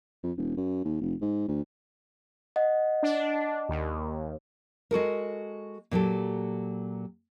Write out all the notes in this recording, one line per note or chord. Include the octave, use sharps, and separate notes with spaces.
F2
E1
F#2
D#2
F1
G#2
D2
D#5 F#5
D4
D#2
G#3 F#4 A4 A#4
A#2 F#3 G4 A4